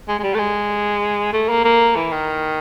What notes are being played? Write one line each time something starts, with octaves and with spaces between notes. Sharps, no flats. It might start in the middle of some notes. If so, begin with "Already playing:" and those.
G#3
G#3
G3
A3
G#3
A3
A#3
A#3
E3
D#3